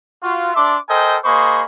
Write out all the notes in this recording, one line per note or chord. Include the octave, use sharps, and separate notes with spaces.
F4 F#4
D4 A4 E5 C6 D6
A4 A#4 C5 D#5 G5 G#5
A#3 G#4 C5 D#5 B5 C#6